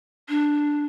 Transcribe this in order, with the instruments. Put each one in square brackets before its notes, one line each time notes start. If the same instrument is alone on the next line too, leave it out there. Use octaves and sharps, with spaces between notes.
[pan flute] D4